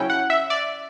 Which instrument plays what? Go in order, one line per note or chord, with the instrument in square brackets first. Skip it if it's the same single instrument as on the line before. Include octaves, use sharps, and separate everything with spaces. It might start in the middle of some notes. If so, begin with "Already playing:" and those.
Already playing: [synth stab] C#3 F#3 C#4 E4 G5
F#5
E5
D5